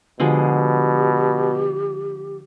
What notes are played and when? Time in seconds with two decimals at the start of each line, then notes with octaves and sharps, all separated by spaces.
0.20 B2 D3 F3 G#3 G4